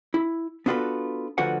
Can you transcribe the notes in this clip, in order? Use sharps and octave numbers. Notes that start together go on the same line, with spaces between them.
E4
B3 D4 F4 F#4 A4 B4
D2 D3 F3 F#4 B4 F#5